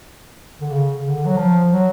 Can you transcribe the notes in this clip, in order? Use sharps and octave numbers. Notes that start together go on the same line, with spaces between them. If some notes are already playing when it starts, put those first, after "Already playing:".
D3
C#3
D3
F#3
F3
F#3